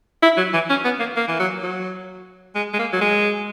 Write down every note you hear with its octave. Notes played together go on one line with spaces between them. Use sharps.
E4
F#3
E3
C#4
B3
A#3
A#3
E3
F#3
F#3
G#3
G#3
A#3
F#3
G#3